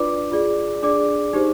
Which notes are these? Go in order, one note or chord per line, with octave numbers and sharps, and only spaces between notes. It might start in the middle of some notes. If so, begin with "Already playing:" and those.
Already playing: D4 F4 B4 D5 D6
F4 G#4 D5
D4 G#4 D5 D6
D#4 G4 C5